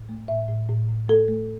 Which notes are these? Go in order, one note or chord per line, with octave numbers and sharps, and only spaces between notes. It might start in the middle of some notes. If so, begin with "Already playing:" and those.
Already playing: A2
A3
A2 E5
A2
A2
A2
A3 A4
A3